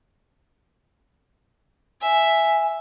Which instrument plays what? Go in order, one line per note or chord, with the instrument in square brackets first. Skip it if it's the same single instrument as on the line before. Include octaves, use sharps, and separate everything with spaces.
[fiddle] E5 [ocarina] G#5